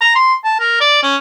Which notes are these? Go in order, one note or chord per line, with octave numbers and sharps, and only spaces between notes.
A#5
C6
A5
A#4
D5
C#4